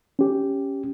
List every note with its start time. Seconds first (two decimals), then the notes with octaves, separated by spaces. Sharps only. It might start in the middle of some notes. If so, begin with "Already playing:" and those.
0.19 C#4 G4